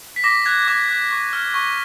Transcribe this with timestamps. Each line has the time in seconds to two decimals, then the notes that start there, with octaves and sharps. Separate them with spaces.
0.16 B6
0.24 D6 A#6
0.46 F#6 G#6
0.67 D6 G#6
0.89 F#6
1.11 C#6
1.33 F6
1.54 C#6